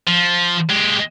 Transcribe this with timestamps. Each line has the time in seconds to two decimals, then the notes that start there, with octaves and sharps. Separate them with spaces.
0.07 F3
0.69 G#3 G4